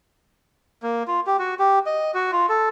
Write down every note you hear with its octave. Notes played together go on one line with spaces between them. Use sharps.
A#3
F4
G4
F#4
G4
D#5
F#4
F4
A4